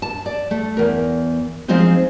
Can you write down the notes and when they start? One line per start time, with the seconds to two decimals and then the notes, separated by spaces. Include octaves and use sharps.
0.02 A5
0.26 D5
0.51 A3
0.77 E2 A#4
1.68 F3 G#3 C4 D#4 F4 C5